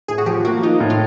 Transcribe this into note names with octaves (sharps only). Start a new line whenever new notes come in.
A2 G#4
F#4
F3 G4
A#3 F#4
D#4 F4
A2
F4